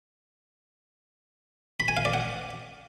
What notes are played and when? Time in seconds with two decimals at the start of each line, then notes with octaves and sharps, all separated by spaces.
1.80 B5
1.88 G#5
1.97 F5
2.05 D5
2.14 F#5